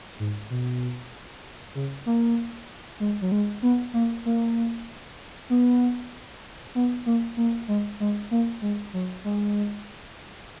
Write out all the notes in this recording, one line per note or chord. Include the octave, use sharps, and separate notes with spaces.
G#2
B2
C#3
A#3
G#3
F#3
G#3
B3
A#3
A#3
B3
B3
A#3
A#3
G#3
G#3
A#3
G#3
F#3
G#3